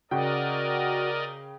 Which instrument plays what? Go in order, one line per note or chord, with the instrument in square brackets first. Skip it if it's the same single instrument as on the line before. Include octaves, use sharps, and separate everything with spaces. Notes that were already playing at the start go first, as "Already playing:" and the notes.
[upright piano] C#3 G5 [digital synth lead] F#4 [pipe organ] A#4 D5 D#5